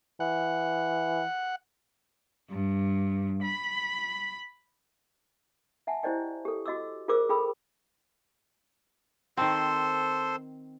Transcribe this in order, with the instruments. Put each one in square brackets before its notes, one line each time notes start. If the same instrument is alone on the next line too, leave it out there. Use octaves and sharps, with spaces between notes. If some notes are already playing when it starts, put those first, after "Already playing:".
[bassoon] E3 [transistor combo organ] F#5
[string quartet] G2
B5
[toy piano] E5 F#5 G#5 A5
E4 G4 C5 D5 D#5 G5
G4 A4
F#4 D#5 D6 E6
F4 G#4 A#4 C5 D6 E6
F4 G#4 A4 G5 B5 E6
[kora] D#3 C4 [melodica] A4 C5 C6